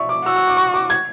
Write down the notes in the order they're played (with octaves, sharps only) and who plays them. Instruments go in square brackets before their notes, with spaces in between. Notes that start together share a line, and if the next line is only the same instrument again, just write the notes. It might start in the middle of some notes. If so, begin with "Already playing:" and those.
Already playing: [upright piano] D5 E5 C#6
D6
[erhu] F#4 [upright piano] E6
[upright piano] E6
D6
C#6
D6
G#6